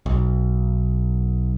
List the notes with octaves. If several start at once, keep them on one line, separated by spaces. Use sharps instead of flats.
B1